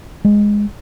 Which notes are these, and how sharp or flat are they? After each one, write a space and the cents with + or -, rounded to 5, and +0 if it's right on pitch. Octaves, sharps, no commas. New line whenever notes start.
G#3 -5